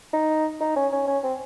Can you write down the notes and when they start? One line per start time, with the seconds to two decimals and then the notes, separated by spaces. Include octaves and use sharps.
0.13 D#4
0.61 D#4
0.76 C#4
0.92 C#4
1.07 C#4
1.23 C4